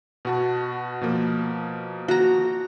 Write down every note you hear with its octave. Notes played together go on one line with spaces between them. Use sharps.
B2 F#4 A5
B2 F3 A#3
F#4 A#5